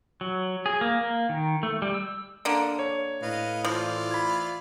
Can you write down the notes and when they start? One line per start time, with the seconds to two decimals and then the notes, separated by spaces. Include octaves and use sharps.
0.21 F#3
0.66 G#4
0.81 A#3
1.01 A#3
1.29 D#3
1.63 A3
1.82 G3
1.94 E6
2.45 D3 A#3
2.79 C#5
3.22 A2 B4 D#5 F5
3.65 E3 F3 F4 D5
4.11 B5 G#6